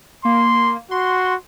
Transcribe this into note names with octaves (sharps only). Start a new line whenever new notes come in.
A#3 C6
F#4 C6